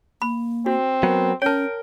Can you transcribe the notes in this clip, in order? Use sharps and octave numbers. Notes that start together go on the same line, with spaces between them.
A#3 B5
C4 F#4
F#3 B3 A#4
C#4 A#4 C#5 G5 A5